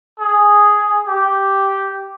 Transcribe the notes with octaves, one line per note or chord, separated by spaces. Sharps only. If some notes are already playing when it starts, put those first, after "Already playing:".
G#4
G4